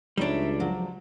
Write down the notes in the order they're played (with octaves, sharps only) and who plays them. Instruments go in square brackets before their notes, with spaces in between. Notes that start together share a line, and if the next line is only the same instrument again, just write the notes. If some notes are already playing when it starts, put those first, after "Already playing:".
[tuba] C#2 [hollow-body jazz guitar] G3 D4 [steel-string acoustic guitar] D#4 C#5 E5
[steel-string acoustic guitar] F3 F#3